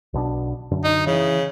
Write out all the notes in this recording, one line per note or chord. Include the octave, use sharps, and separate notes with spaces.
B1 B2 D4
F#2 D3
D#4
C#3 E3